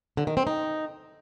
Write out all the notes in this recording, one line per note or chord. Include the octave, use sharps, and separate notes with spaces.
D3
D#3
C4
D#4